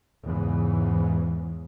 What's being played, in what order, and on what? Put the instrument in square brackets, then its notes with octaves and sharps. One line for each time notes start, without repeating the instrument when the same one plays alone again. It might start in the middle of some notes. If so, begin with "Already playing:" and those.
[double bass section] E2 G#2 C#3 E3